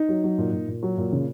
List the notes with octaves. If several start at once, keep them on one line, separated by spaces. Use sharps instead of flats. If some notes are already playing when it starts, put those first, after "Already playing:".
Already playing: D#4
F#3
F#3
A#2
A#2
A#2
F#3
A#2
C#3